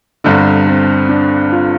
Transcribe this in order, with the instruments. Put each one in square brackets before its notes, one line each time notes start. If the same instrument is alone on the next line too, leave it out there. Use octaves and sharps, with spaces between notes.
[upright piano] G1 G2 D3 [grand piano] C4
[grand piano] C4
D4
F4